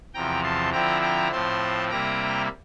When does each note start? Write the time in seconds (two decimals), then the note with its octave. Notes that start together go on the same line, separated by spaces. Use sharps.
0.14 E2 C3 F3 G5 A#5
0.43 A5 C6
0.73 D3 F3 C4 E4 G5 A#5
1.02 G5 A#5
1.32 A2 F3 C4 A5 C6
1.89 C3 G3 A#3 E4 G5 A#5